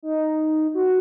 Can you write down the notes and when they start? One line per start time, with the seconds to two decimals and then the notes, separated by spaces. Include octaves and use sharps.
0.03 D#4
0.75 F#4